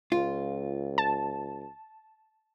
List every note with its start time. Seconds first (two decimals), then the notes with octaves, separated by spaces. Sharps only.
0.12 C#2 F4
0.98 A5